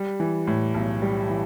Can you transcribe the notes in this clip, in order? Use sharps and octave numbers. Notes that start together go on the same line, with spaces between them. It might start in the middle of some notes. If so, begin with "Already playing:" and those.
Already playing: G3
E3
A2
B1
G3
E3